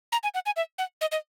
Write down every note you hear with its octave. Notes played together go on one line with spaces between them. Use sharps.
A#5
G#5
F#5
G#5
E5
F#5
D#5
D#5